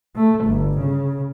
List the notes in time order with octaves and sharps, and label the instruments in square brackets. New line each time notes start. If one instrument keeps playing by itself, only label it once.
[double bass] A3
G1
C#3